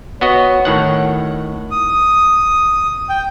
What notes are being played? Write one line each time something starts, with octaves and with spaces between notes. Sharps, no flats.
B3 F#4 C#5 D#5
A2 D#3 F#5
D#6
G5